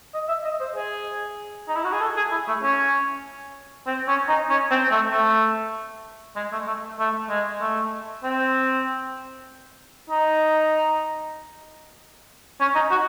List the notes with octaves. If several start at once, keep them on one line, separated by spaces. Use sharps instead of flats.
D#5
E5
D#5
C5
G#4
D#4
E4
F#4
G#4
A4
G#4
E4
A3
C#4
C4
C#4
D#4
C#4
C4
A3
A3
G#3
A3
A3
A3
G#3
A3
C4
D#4
C#4
D#4
F#4